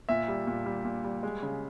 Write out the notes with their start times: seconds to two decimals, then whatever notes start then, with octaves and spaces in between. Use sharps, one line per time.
0.09 A#2 E5
0.28 G3
0.47 A#2
0.66 G3
0.85 A#2
1.04 G3
1.23 G#3
1.42 C#3